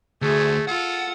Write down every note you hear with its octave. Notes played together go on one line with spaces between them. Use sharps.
D2 A3 G#4
F4 A4 F#5